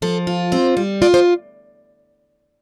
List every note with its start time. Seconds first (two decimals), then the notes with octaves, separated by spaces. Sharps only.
0.02 F3 A4
0.27 F4
0.52 C4 C5
0.77 G3
1.02 F4 D5
1.14 C5